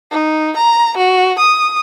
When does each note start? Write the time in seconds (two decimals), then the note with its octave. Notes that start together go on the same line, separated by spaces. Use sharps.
0.11 D#4
0.57 A#5
0.97 F#4
1.39 D#6